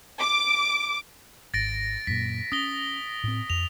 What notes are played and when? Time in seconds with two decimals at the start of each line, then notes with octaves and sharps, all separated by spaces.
0.20 D6
1.54 G#1 A6 A#6 D7
2.07 F#2 A#2 B6
2.52 C#4 D#6 A#6 G7
3.24 A2 C4
3.50 F2 F7